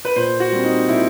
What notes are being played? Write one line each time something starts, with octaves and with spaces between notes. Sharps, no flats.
B4
A#2 C5
F#4
G3 C4
D#4
A#2 E4